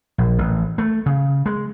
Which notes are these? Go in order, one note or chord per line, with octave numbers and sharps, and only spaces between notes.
A#1
A1
A3
C#3
G#3